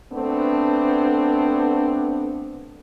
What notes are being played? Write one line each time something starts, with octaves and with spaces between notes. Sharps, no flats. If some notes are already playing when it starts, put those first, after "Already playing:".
A3 B3 C4 D4